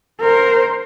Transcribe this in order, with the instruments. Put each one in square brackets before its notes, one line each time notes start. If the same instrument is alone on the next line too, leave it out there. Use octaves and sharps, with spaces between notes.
[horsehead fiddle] A#4 C5